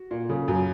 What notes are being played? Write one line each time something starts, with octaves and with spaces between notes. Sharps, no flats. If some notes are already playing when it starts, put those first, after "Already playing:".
Already playing: F#4
A#2
C#3
F#2